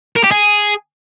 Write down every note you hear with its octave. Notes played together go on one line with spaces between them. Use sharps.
A#4
G4
G#4